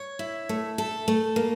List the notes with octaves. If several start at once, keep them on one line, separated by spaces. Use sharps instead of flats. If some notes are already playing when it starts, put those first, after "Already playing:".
Already playing: C#5
E4
A3
A4
A3
A#3